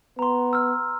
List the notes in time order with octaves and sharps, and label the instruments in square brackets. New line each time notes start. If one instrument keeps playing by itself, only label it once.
[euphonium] B3 [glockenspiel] A#5 C6
[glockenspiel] E6 F6